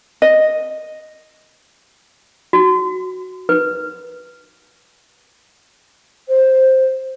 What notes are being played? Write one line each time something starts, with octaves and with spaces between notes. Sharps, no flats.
D#5
F#4
B4
C5